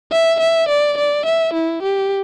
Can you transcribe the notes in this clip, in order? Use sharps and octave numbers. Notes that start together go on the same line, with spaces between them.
E5
E5
D5
D5
E5
E4
G4